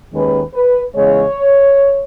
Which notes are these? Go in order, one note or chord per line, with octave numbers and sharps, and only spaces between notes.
D#2 D#3 G#3 C#4 B4
B4
E2 C#3 G#3 C#5